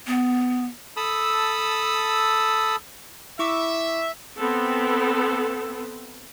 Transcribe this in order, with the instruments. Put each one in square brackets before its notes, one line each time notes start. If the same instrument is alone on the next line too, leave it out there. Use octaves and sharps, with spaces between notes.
[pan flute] B3
[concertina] A4 A5 B5 D#6 E6
[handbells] E4 C#6 D6 [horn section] E5
[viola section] B3 C4 A4